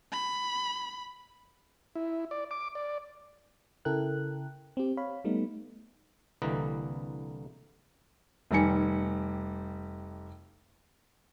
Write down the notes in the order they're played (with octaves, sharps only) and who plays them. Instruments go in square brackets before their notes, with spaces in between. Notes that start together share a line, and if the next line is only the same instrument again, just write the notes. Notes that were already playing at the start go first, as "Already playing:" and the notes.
[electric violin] B5
[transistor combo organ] E4
D5
D6
D5
[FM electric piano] C#3 E4 A4 A#4 G5 F#6
C4 G4
C#5 F5 B5
G3 A3 B3 D#4
[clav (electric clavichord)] C2 D3 E3 A#3 B4 D#5
[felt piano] F1 D#3 G3 G#5 C#7